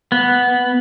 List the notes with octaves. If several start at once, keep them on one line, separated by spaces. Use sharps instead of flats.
B3